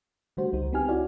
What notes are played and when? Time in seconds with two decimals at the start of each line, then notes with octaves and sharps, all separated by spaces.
0.37 D3 G3 A3 F#4 C5
0.53 C#2 D#4
0.72 B3 C4 D#4 G4 G#5 F6
0.89 E4 F#4 C#5 D5